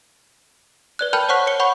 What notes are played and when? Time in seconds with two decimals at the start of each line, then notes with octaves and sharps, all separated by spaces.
0.99 B4 D5 F#6
1.13 A#4 G5 A5 B5 F6 G6
1.29 C5 C#5 F#5 C#6 F#6 B6
1.47 C#5 C#7 G7
1.60 F#5 B5 C#6 G6